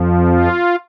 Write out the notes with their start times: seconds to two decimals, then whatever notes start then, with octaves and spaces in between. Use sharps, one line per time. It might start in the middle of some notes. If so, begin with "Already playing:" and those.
Already playing: F2 F3
0.27 F4